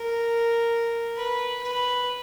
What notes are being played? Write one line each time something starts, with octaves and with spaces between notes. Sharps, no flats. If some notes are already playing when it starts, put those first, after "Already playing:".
Already playing: A#4
B4
B4